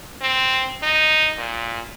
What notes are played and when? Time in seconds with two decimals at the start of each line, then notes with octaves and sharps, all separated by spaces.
0.21 C4
0.83 D#4
1.38 A#2